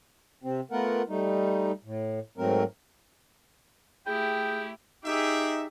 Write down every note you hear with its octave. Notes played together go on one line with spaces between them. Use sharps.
C3 C4
A3 B3 F4 A#4 F#5
G3 A3 D#4
A2
G#2 F#3 A3 C4 A#4
A3 E4 G4 G#4 G5
D#4 G4 G#4 E5